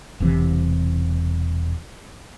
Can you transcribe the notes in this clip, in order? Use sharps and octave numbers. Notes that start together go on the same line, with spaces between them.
E1 C2 C3 E3